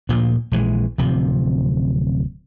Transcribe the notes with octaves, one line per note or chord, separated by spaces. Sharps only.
D2 A#2 F3
A#1 E3 F3 G#3
D1 C3 F3